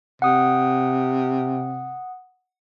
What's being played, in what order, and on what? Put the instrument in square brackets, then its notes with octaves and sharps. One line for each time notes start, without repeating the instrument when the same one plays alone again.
[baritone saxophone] C3 [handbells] F#5 D#6